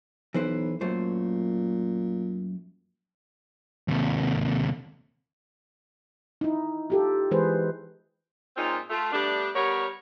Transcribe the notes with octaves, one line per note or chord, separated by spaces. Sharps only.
B1 E3 B4 C5
F#2 A#2 A3 C5
D#2 C3
D#4 E4
F4 G4 A4
E3 G#3 G#4 B4 C5
A#2 G#3 C4 C#4 D#4 F4
A3 F4
G3 A3 B3 D4
G3 B3 A#4 C#5